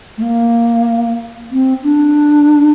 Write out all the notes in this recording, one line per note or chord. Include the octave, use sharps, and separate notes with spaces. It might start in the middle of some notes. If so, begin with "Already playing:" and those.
A3
A#3
C4
D4